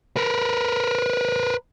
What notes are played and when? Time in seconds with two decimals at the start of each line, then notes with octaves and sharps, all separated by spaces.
0.16 A#4 B4